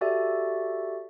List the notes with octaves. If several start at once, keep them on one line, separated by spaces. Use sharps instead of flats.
F#4 G4 A4 D5 E5